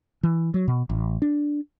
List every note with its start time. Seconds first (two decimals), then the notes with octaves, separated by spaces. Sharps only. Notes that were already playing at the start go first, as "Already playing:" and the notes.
0.23 E3
0.54 F#3
0.68 B2
0.89 A1
1.22 D4